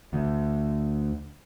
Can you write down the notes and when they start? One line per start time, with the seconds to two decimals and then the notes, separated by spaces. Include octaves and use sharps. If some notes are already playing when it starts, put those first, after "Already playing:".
0.13 D2